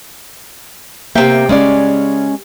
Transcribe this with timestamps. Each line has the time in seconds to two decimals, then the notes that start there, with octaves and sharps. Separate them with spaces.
1.15 C3 A#3 E5 G5
1.49 C#3 G#3 C#4 D5